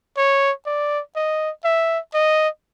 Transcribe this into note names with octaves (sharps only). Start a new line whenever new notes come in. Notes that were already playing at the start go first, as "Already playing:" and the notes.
C#5
D5
D#5
E5
D#5